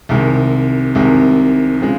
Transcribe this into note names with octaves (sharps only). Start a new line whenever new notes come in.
C2 C3 D#3 G#3
C2 C3 D#3 G#3
C#3 F3 G#3